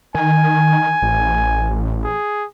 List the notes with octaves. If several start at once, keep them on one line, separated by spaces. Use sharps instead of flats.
D#3 G#5
A1
G#4